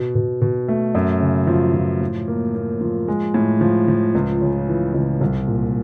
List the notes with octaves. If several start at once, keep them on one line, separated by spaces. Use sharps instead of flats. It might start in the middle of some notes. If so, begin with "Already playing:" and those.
Already playing: B2
B2
B2
A3
F#2
C#3
F3
F3
A2
A#3
A#3
F3
G#3
A2
F3
F3
C#2
C#3
E3
C#2
C2
A#2